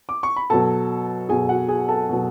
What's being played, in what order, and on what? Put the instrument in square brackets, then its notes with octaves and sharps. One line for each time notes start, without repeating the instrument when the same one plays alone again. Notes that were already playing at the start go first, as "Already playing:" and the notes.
[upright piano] D6
C#6
B5
B2 F#3 A4 A5
B2 F#3 G#4 G#5
F#4 F#5
G#4 G#5
A4 A5
B2 F#3